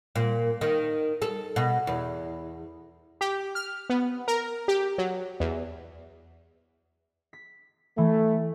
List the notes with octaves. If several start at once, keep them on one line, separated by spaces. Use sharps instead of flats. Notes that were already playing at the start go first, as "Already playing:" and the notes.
A#2
D#3
A4
B2
E2
G4
F6
B3
A#4
G4
F#3
E2
B6
E3 A3